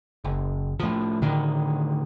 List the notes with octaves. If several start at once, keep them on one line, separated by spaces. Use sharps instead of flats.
F#1
A2 F3
A2 D3 D#3